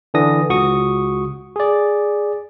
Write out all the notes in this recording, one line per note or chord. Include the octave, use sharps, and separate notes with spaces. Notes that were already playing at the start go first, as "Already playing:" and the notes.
D3 E3 D4 D#6 A#6
C#2 F#4 C#6 D#6
G#4 D5